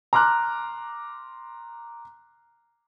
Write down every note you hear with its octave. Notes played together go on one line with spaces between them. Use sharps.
A#5 C6 D6 F6 F#6